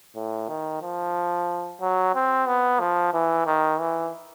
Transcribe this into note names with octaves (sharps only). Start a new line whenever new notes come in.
A2
D#3
F3
F#3
C4
B3
F3
E3
D#3
E3